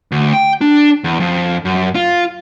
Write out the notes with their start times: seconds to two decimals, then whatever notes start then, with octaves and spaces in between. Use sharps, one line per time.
0.12 D2
0.33 G5
0.61 D4
1.04 E2
1.20 F2
1.65 F#2
1.95 F4